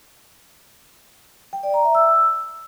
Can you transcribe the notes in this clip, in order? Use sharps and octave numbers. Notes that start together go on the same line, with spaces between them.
G5
D5
A#5
E5
E6